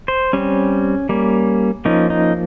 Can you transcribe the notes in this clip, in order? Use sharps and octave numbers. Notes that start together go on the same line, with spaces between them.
C5
G3 C4 C#4
G3 A#3 C#4
F3 A#3 C#4 D#4
D#4